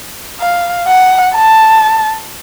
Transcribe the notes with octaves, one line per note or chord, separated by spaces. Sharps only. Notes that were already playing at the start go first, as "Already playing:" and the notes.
F5
F#5
A5